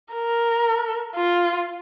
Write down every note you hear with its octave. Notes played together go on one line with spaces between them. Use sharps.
A#4
F4